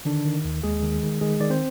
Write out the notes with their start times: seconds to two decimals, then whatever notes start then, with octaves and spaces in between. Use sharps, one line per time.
0.05 D3 D#3 D4
0.25 D#3
0.44 D#2
0.63 D#2 G#3 G#4
0.83 D#3
1.03 D#3
1.21 D#3 G#3 G#4
1.40 D#3 D5
1.50 C4 C5